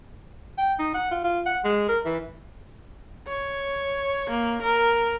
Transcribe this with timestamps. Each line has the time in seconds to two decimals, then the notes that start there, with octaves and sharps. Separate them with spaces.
0.58 G5
0.79 D#4
0.94 F#5
1.11 F4
1.24 F4
1.46 F#5
1.65 G#3
1.89 A#4
2.05 E3
3.28 C#5
4.29 A#3
4.62 A#4